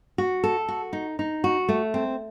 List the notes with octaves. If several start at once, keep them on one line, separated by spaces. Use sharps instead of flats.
F#4
A4
F#4
D#4
D#4
F#4
A3
C4